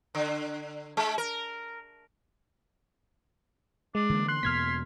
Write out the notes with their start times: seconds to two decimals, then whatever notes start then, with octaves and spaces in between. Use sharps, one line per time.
0.15 D3
0.97 G#3
1.18 A#4
3.95 G#3 D4
4.10 D3 E3 A#3
4.28 C6 F#6
4.43 E2 B2 A#3 F6 G#6 B6